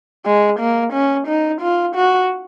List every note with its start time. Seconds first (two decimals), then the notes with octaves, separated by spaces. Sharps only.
0.26 G#3
0.60 A#3
0.93 C#4
1.27 D#4
1.61 F4
1.95 F#4